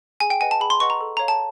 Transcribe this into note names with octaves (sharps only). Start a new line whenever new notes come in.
G#4 G#5
G5
B4 D#5 F#5 G#5
A5
G#4 B5
C6
B4 D#5 F#5 C#6
A#5
A4
C#5 F5 A#5
A5